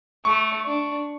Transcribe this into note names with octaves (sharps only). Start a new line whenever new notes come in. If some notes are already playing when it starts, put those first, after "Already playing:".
A3 C#6
D4